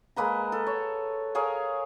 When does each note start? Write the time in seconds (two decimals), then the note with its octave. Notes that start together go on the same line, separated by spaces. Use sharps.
0.16 G#3 A#3 B4 A#5
0.52 A4
0.67 C#5
1.35 G#4 A#4 C#5 F5